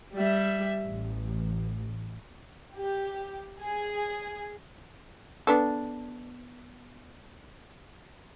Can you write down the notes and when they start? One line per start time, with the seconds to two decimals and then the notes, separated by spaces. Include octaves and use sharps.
0.16 G3 E5
0.83 A1
2.75 G4
3.61 G#4
5.47 B3 D4 A4